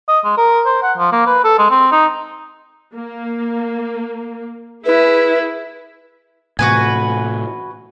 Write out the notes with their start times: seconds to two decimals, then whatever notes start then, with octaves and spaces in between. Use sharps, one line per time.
0.08 D#5
0.24 G#3
0.38 A#4
0.66 C5
0.83 F#5
0.97 F3
1.12 A#3
1.26 B4
1.44 A4
1.58 G#3
1.70 C4
1.92 D#4
2.93 A#3
4.86 E4 G#4 B4
6.59 A2 C3 E3 F#4 B4 G#5